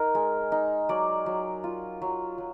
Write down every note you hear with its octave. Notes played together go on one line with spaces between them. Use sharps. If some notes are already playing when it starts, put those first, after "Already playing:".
Already playing: D#4 A#4
G#3
D#4
F#3 D5
F#3
F4
F#3
F#3